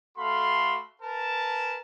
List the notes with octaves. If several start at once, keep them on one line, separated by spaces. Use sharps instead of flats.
A3 F#4 A4 F5 B5 C6
A#4 B4 G#5 A5